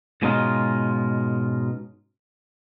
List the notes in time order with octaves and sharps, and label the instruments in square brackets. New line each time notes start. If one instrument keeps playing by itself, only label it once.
[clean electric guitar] G#2 B2 G#3 C#4 D#4 F4